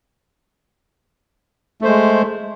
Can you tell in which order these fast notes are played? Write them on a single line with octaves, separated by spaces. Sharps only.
A3 C5 G#3